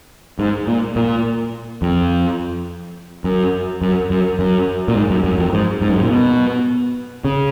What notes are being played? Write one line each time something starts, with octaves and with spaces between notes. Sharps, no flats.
G#2
A#2
A#2
F2
F#2
F#2
F#2
F#2
A#2
G#2
F#2
F#2
F2
G#2
G#2
F#2
G#2
A#2
B2
C#3